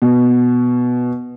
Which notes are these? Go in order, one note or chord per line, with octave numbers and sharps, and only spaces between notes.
B2